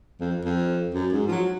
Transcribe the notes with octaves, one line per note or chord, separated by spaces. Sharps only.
F2
F2
F#2
G#2
F3
F#3